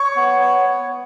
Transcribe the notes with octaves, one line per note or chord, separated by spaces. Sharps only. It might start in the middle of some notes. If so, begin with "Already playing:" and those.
Already playing: C#5 C#6
B3
C#5
C#5